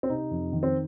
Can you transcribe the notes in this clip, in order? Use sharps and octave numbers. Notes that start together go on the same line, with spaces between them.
C4
C3 D#4
F2
D#3
C4